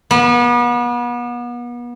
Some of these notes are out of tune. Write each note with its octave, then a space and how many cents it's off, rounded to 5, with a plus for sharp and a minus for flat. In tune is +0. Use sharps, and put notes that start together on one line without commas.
B3 -35